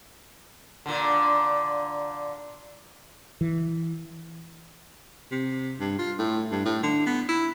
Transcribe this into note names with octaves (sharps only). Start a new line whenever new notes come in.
A#2 D3
E3
C3
G2
F4
A2
G2
A2
D3
B3
E4